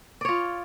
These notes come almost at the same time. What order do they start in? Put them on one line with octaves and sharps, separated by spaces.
D5 C#5 F4